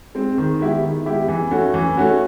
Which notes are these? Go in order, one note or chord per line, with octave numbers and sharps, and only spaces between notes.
G#3 C4
D#3
G#3 B3 E4 G4
D#3
G#3 B3 E4 G4
E3
A3 C#4 F#4
E3
A3 C#4 F#4